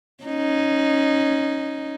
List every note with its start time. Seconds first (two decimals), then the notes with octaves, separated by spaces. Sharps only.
0.24 C#4 D#4